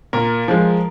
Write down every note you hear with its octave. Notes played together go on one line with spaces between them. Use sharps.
A#2 A#4
F3 G#3